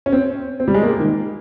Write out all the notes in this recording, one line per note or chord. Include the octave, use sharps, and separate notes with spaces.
C#4
C4
C4
G3
G#3
A#3
D#3